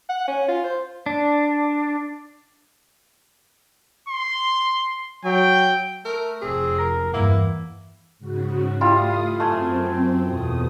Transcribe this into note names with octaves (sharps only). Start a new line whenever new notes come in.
F#5
C#4
F4
C5
D4
C6
F#3 G5
A3 A#4
F1 C4 G#4
A#4 A#6
E2 G2 E3 A#3 E4 F#5
G#2 C#3 F#4
G3 A3 E4 F4 F5 D#6
F#2 A3 C4 G#5
E2 B2 D#6